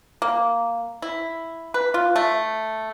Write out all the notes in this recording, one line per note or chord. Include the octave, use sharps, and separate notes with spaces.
A#3
E4
B4
F4
A3